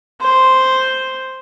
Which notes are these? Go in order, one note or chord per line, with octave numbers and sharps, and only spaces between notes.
C5